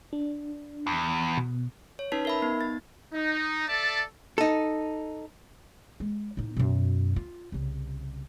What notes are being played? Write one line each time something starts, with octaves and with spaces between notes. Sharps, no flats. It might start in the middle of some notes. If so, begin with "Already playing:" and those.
D4
E2
B2
C#5
C#4 D#4 B4 A5 B6
A#4 E5 B5
B3 D#4
A6
D#4
A4 D5 E5 A5
D#4 A4
G#3
A2 D#4
F#2 B2
F4
C2 C#3